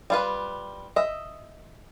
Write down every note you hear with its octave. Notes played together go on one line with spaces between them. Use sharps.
G3 F4 B4
D#5 E5